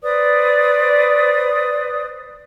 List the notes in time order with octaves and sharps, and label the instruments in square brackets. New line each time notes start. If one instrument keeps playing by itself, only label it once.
[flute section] B4 C5 D5 D#6